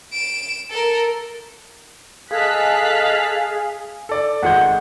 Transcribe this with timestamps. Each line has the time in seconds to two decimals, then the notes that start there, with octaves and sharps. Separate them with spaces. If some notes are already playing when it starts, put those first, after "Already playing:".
0.12 D7 E7
0.70 A4 A#4
2.31 G#4 A4 D#5 F5 A5 F#6 B6
4.09 A4 D5
4.43 G#1 G#3 F#5 G6